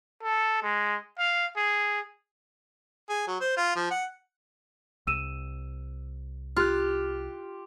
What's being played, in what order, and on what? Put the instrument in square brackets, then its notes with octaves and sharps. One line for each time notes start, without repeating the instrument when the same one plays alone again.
[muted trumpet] A4
G#3
F5
G#4
[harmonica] G#4
F#3
C5
F4
F3
F#5
[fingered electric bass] C2 [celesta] E6 D#7 E7
[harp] F4 [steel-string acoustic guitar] G4 [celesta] F6 F#6